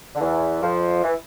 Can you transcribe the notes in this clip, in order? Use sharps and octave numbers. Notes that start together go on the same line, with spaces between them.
D3
E2 E3
F2 F3
E3